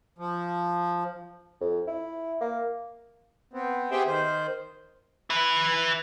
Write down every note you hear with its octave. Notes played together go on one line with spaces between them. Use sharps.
F3
F2
E4
A#3
B3 C4
B3 G4 G#4 C5 E5 G5
D#3 C5
E4 B4